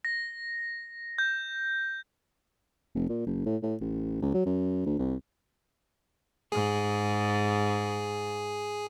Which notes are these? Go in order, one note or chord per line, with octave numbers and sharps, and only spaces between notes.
A#6
G6
F1
A#2
F#1
A2
A2
A1
C#2
F#3
F#2
D2
C2
G#2 G#4